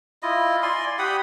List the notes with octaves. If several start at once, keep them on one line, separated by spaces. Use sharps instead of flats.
E4 F4 D#5
D5 G#5 C6
G4 F#5 B5 D#6